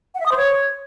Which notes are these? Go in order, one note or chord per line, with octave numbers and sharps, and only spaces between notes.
F#5
E5
D#6
C5
C#5